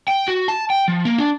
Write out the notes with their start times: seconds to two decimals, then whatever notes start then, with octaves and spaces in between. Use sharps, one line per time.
0.08 G5
0.28 F#4
0.48 A5
0.70 G5
0.88 F3
1.05 A#3
1.18 D4